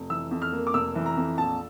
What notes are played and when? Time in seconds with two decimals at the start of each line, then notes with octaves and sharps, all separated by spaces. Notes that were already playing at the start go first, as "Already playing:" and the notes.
Already playing: F1
0.10 E3 E6
0.31 F2
0.42 F6
0.53 A#3
0.67 D6
0.74 F1 E6
0.95 E3
1.06 A#5
1.17 F2
1.38 A#1 A5